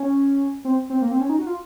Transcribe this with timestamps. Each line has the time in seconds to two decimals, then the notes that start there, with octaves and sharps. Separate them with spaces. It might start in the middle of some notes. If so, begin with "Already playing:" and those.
Already playing: C#4
0.65 C4
0.90 C4
1.02 A#3
1.11 C4
1.20 C#4
1.29 D#4
1.39 F#4
1.46 F4